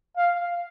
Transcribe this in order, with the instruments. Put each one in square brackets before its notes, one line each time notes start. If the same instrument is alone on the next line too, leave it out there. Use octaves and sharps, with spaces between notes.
[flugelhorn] F5